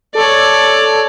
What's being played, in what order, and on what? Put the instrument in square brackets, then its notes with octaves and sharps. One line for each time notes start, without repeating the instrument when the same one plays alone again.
[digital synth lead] A4 [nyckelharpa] C#5 D5